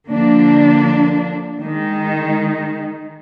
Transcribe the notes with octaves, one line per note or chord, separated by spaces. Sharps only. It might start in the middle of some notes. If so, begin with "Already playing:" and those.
D3 F3 A#3 D4
D#3 G#3 D#4